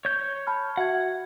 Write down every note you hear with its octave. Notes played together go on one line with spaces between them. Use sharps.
C#5 G6
A5 B5 F6
F#4 E5 F#5 G#6